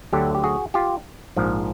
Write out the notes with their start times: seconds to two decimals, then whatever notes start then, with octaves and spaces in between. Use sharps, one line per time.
0.13 D2 D3 F#3 G4 A4
0.35 G4
0.44 F#4 G#4
0.74 F4 G4
1.37 A#1 G#2 F3